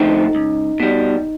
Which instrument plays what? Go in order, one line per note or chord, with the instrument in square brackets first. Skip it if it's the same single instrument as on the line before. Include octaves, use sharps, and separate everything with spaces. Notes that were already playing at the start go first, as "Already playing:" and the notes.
Already playing: [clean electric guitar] D3 F3 A3 C4 [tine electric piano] D#4
[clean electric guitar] C#2
B2 G3